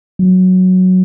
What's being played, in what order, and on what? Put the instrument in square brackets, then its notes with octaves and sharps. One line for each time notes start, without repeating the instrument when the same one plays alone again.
[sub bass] F#3